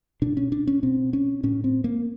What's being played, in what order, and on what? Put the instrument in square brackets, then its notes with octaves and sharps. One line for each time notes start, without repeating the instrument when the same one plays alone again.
[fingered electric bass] B2 D4
C#4
D4
C#4
B2 C4
C#4
A2 C#4
C4
A#3